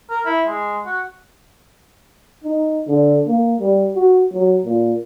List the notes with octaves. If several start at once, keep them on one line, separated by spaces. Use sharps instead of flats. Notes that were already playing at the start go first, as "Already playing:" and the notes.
A#4
E4
G#3
F#4
D#4
D3
A#3
G3
F#4
F#3
A#2